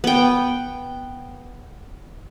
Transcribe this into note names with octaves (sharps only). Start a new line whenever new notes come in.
B3 G5